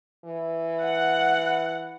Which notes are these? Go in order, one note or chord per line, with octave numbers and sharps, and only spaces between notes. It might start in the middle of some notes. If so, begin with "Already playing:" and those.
E3
F#5